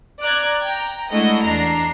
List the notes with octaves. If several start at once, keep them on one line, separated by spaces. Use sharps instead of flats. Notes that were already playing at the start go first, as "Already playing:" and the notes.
D5 A#5 F#6 G#6
G5 A#5
G#3 A3 D4 E4 F#4 D#5
E2 D4 A#5 C7